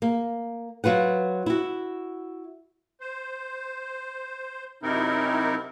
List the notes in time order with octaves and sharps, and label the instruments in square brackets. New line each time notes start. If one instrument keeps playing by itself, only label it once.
[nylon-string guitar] A#3
F#3 F4 B4 F#5
E4 F#4
[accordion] C5
F#2 C3 C4 D#4 E4 A#4